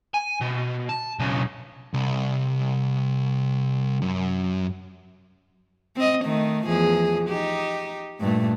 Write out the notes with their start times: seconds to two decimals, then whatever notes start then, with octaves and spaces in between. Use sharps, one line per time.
0.14 G#5
0.41 B2
0.89 A5
1.19 B1 C#3
1.94 C2
4.02 F#2
5.96 C4 D#5
6.25 D#3 A3
6.66 E2 F3 G#4
7.29 D#4 G4
8.20 G2 A#2 A3